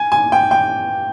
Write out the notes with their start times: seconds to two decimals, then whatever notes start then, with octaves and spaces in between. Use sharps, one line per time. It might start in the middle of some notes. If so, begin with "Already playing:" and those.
Already playing: G#5
0.12 G#5
0.32 G5
0.51 G5